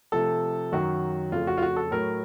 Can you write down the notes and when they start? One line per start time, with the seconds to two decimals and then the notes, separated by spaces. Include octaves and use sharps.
0.12 C3 F3 A3 A4
0.72 F#2 D#3 F#3 F#4
1.32 F2 C#3 A3 F4
1.47 F#4
1.57 F4
1.62 F#4
1.76 A4
1.91 A2 F#3 A3 A#4